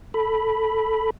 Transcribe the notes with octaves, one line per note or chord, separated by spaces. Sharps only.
A4 B5